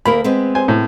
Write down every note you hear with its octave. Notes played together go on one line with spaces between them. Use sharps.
D2 A#3 A#4 B5
G#3 B3 C4
C5 G#5
A2